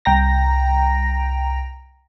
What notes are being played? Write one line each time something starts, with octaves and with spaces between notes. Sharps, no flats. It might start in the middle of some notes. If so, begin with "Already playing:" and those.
C2 G5 A#5 A#6